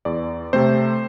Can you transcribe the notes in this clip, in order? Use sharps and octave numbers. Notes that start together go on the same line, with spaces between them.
E2 D5
C3 A3 C4 C5